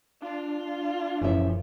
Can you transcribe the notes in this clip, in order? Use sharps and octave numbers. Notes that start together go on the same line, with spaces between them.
D4 F4
F1 F#2 A#2 E3 F3 C#4 E5